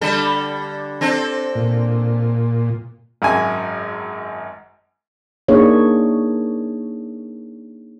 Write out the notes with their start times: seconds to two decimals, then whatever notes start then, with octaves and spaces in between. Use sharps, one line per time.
0.01 D3 G3 A4
1.01 C4 D4 A4
1.55 A#2
3.22 G#1 F#2 G#5
5.48 A#3 D4 D#4 G#4 C#5